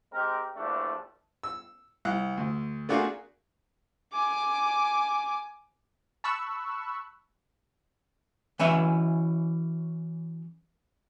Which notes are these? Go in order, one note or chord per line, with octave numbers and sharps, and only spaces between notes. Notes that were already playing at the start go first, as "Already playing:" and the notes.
G#3 C4 G4 A#4
A#1 E2 G2 A3 D4
E6
C2 F#6
D2
A3 A#3 D4 F4 F#4 G#4
G#5 D6
A5 B5 C#6 E6 F#6
E3 F#3 C#4 B4 E5